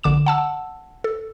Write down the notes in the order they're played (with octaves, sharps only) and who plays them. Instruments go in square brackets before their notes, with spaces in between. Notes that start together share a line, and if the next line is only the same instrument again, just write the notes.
[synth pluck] A#1 D3 D6 E7
F#5 A5 E6
A4